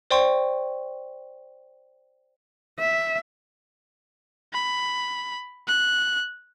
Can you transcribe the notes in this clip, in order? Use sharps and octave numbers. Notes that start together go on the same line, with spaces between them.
C5 D5 G5 C6 C#6
E5
B5
F#6